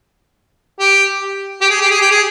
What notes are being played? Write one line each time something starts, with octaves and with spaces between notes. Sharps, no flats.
G4
G4
G#4
G4
G#4
G4
G#4